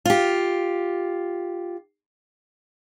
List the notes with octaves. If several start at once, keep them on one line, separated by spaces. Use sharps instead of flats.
F4 G4